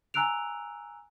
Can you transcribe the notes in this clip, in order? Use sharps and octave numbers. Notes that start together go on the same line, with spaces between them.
G#5 A#5 E6 F#6 D7 F7